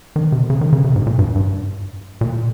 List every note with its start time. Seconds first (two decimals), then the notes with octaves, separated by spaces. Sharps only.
0.16 D#3
0.32 C3
0.50 C#3
0.61 D#3
0.73 C#3
0.84 C3
0.96 G#2
1.07 A#2
1.19 G2
1.36 G2
2.21 A#2